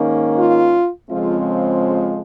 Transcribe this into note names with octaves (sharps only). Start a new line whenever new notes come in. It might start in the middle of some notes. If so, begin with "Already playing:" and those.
Already playing: G#2 D#3 A#3 C#4
F4
F2 C#3 F3 G#3 C4 F4